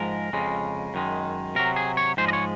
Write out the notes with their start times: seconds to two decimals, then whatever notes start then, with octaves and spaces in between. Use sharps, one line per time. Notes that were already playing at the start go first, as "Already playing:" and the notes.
Already playing: G#2 F3 G#3 A#4
0.33 F2 C#3 G#3
0.94 F#2 D#3 G#3
1.55 C3 F#3 A#4
1.76 G#4
1.97 C#5
2.17 G#2 F3 G#3 C5
2.28 D#5
2.33 C#5